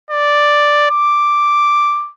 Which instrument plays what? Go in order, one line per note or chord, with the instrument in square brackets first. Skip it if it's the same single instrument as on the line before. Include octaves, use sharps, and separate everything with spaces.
[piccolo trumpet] D5
D6